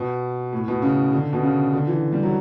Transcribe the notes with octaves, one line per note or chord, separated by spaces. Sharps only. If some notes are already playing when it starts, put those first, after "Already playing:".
Already playing: B2
A2
B2
C#3
D3
B2
C#3
D3
E3
G3
F#3